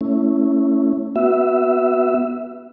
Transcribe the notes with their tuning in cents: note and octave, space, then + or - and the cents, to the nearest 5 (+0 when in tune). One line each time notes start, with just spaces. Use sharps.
A3 +25 C#4 +0 E4 +0
B3 -10 F#4 +0 E5 +0